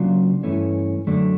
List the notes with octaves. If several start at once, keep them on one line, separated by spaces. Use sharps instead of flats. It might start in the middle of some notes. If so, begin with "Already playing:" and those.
Already playing: C#3 F#3 A#3 D4 F4
G2 E3 A3 C#4
F#2 D3 F#3 A3 D4